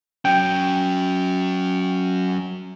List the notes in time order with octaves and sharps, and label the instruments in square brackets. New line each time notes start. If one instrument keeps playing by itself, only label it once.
[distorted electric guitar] F#3 C#4 [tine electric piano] G5